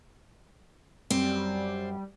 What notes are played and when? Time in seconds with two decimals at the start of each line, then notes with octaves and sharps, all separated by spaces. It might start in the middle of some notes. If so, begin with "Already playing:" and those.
1.10 F#2 G3 C4